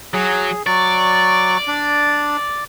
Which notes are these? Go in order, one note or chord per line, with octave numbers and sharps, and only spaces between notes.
F#3 G#4
F#3 D5 C#6
D4